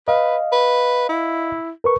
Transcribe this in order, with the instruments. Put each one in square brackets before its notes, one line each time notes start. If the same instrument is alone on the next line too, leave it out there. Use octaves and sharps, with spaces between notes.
[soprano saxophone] B4 [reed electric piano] D#5 F5
[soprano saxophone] B4
E4
[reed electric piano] A#4 B4 C#6